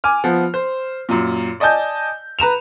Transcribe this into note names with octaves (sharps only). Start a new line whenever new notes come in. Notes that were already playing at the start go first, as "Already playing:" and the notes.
G#5 D6 F6
F3 B3
C5
F#2 A#2
D5 D#5 G#5 A5 G6
B4 A#5 E7 F7